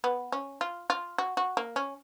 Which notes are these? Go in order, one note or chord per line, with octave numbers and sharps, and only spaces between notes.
B3
C#4
F4
F4
F#4
F#4
A#3
C#4